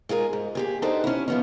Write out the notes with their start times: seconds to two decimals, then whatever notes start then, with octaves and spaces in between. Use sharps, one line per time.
0.09 G#3 F4 G#4 A#4
0.33 G#2
0.55 A#2 G4 G#4
0.82 D4 D#4 F#4 G4 A4 C5
1.04 C#4 E4
1.28 F3 B3 C#4